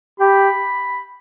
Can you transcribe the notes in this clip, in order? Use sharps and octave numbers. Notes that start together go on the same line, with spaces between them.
G4 B5